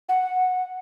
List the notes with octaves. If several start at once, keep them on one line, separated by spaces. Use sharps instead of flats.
F#5